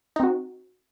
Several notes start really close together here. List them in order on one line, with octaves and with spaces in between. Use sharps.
D#4 C4 F#4